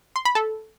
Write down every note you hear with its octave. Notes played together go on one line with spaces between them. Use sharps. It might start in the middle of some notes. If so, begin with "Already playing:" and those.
C6
B5
A4